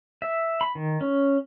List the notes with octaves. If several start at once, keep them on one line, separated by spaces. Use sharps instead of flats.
E5
B5
D#3
C#4